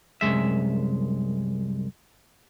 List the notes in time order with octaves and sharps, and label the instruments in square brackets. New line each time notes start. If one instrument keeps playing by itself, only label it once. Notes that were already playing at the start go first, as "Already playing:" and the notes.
[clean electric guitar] C2 F#2 A2 G#3 E5